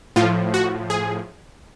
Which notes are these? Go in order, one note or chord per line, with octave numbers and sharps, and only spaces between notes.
A2 F3 F4
F#4
G#4